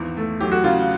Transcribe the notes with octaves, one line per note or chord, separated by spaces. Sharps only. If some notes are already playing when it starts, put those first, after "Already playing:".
Already playing: G#1 E2
A3
F#3 G4
F#4
C#3 F4